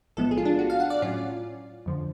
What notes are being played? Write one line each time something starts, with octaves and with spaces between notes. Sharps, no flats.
B1 A2 F3 G#3 B3 A4
G#4
F4
D4
F#4
F5
F#5
D5
A2 F#3 C#4 F4
F2 D3 F3